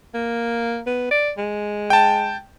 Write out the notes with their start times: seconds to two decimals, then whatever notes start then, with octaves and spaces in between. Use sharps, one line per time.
0.14 A#3
0.86 B3
1.11 D5
1.38 G#3
1.90 G5 A5